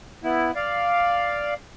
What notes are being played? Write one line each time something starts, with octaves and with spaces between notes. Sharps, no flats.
B3 E4
D5 F5